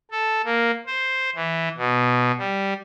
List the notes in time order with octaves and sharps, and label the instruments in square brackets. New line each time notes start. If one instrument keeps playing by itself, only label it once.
[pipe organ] A4
A#3
C5
E3
B2
G3